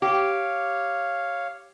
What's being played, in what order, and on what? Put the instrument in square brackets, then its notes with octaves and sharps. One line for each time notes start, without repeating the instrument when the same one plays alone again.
[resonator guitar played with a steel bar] G4 [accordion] C#5 F5